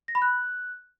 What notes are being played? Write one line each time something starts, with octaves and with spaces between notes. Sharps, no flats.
A#6
B5
F#6